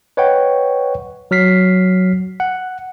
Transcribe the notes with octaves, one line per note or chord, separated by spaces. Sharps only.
B4 C#5 D#5 F#5 G5 C#6
F#3 F6 B6 C7
F#5